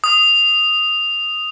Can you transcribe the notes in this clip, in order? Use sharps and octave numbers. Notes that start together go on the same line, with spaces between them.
D#6